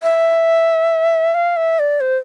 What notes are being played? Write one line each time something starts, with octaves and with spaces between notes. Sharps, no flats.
E5
F5
E5
D5
C5